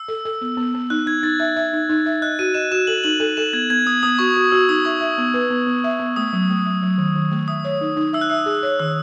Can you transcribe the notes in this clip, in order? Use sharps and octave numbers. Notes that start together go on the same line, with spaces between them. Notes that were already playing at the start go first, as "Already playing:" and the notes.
Already playing: E6
A4
A4
B3
B3
B3
D#4 F#6
D#4 G#6
D#4 A6
E5
E5
D#4
D#4
E5
D#5 F#6
F#4 D#7
D#5 E7
F#4 E7
A4 F#7
D#4 F#7
A4 E7
A4 E7
B3 G#6
B3 G#6
B3 D#6
B3 D#6
F#4 C#6
F#4
F#4 E6
D#4 D#6
E5 C#6
E5
B3
B4
B3
B3
E5
B3
A3 D#6
F#3
A3
F#3
F#3
D#3
D#3
A3
E5 D#6
C#5
D#4
D#4
E5 E6
F#6
E5 E6
G#4
C#5
D#3 E6